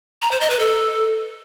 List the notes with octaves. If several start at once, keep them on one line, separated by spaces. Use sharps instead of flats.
A#5
C5
D#5
B4
A4